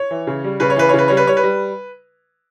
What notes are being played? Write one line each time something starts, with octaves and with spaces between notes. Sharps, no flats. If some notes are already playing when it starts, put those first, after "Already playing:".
Already playing: C#5
E3
C#3
G3
C#3 B4
C#5
E3 B4
C#5
C#3 B4
G3 C#5
B4
G3 C#5
B4
G3